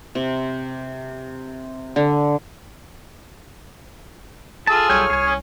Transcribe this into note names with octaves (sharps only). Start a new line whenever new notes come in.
C3
D3
F4 G#4 A4 A5
B1 G3 C#5 G5 G#5 F6
C2 G#4 G#5
C#4